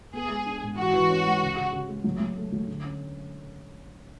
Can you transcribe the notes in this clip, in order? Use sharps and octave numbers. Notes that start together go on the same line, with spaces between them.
B3 G#4
G#3
D4
G#2
E3 F#4
E3
C#4
G#3
C#3
C#3
C#3
G#3
F#3
F#3
A3
F#3
D3
C#4